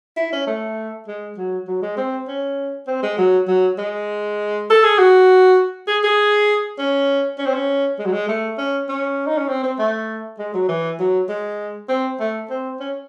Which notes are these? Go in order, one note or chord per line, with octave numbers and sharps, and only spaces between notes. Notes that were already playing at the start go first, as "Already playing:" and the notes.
E4
C#4
A3
G#3
F#3
F#3
G#3
C4
C#4
C4
G#3
F#3
F#3
G#3
A4
G#4
F#4
G#4
G#4
C#4
C#4
C4
C#4
G#3
F#3
G#3
A3
C#4
C#4
D#4
C#4
C4
C4
A3
G#3
F#3
E3
F#3
G#3
C4
A3
C4
C#4